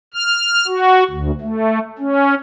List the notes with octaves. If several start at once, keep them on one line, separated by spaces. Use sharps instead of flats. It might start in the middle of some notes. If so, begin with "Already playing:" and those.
F6
F#4
D2
A3
C#4